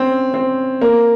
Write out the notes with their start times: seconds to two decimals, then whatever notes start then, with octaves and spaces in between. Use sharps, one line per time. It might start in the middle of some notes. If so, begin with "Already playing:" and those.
Already playing: C4 C#4
0.34 C4
0.82 A#3